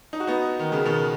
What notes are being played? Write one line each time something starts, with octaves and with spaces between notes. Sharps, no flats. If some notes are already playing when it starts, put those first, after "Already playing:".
D#4
F#4
B3 D#4
D#3
C#3
B2 D#3